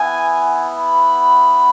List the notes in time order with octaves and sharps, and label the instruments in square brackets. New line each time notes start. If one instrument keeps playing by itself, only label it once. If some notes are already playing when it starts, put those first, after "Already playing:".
Already playing: [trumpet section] B3 E4 G#5
B5